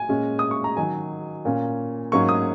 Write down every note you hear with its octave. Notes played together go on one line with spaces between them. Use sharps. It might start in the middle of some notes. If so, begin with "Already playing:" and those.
Already playing: G#5
A#2 G#3 C#4
D#6
C#6
A#5
D#3 F#3 D#4 G#5
A#2 A#3 C#4
G#2 F#3 A#3 C#4 C#6
D#6